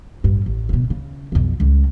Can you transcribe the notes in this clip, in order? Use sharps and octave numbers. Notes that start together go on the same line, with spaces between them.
A1 G2
A1
D1 B2
C#3
B1 F2
C#2 G3